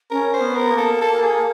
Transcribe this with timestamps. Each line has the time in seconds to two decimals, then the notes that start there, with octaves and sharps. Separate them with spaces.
0.11 C#4 A#4
0.34 C5
0.41 B3
0.56 A#4
0.71 A#3
0.78 A4
1.01 A4
1.23 G#4